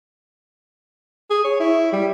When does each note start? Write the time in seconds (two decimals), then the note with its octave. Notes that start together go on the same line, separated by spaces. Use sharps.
1.30 G#4
1.44 C#5
1.60 E4
1.93 G3